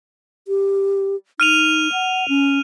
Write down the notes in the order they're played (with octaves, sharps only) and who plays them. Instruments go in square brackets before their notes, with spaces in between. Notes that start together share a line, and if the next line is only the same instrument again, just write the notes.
[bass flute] G4
[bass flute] D#4 [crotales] F6 D#7 F7
[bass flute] F#5
C#4